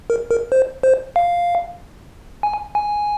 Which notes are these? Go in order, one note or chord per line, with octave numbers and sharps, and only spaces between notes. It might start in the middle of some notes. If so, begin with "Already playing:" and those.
A#4
A#4
C5
C5
F5
G#5
G#5